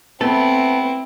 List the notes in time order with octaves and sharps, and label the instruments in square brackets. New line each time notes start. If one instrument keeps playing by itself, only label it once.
[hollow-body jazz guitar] A3 B3 A4 [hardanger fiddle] C4 E4